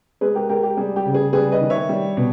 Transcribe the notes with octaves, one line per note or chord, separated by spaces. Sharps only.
G#3 G#4 B4
G4 A#4
G#3 G4 A#4
G4
G3 G#4
G4
C#3
G#4
G3 G#4 B4
B4 D#5
D#3
C#5 E5
G3
B2